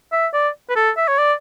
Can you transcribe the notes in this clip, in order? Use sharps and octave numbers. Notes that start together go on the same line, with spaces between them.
E5
D5
B4
A4
E5
C#5
D5